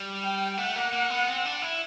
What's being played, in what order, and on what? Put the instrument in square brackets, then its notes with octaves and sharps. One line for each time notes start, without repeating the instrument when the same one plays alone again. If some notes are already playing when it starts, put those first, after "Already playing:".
Already playing: [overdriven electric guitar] G3
[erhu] G5
[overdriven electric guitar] A3 [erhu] F#5
[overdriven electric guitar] A#3
A#3
B3
C4
D4
E4